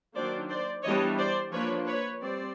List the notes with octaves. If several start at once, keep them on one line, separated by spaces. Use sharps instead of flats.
D#3 F#3 A#3 D4 C5 D5
C5 D5
E3 G3 B3 D4 C#5 D#5
C5 D5
F3 A#3 D4 B4 C#5
B4 C#5
G3 C4 C5 D5